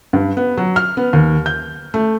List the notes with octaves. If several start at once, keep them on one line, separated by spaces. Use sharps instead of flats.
G2
B3
F#3
F6
B3
D#2
G6
A3